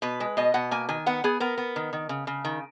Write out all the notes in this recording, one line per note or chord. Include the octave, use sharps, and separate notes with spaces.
B2 B4
G#3
B2 D#5
B2 F#5
A#3 G#5
D#3 G#5
B3 F#5
B3 G#4
B3 A#4
B3
D#3
D#3
C#3
C#3
D#3